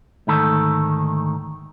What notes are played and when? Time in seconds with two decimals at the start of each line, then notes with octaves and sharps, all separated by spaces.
0.27 D2 G#2 D#3 A3 A4